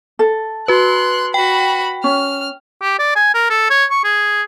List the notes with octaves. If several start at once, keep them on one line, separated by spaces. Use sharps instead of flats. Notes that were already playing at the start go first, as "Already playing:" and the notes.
A4
F#4 B4 C6 F#6
F#4 G5 B5
C#4 F6
G4
D5
G#5
A#4
A4
C#5
C#6
G#4